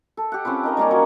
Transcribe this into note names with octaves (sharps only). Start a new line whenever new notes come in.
A4
G4 F#5
C4 C#4 F4 B4
D#4 A#4 D#5
G3 A#3 C#4
F#3 C#5